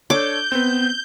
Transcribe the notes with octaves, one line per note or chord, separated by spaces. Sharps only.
D4 A4 C#5 D6 G6
B3 C4 B4